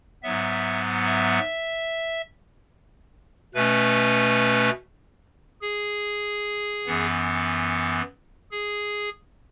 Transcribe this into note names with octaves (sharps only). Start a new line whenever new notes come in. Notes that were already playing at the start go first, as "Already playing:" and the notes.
G#2 F#3 B3 E5
E5
B2 A3 C#4 B4
G#4
F#2 E3 B3
G#4